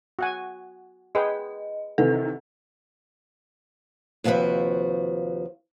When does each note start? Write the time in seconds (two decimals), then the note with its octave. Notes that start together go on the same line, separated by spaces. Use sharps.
0.19 F#4 F#5 G#5
1.15 G#4 B4 D#5 G5
1.98 C3 D#3 E3 A4
4.24 D#2 C3 F3 F#4 B4 E5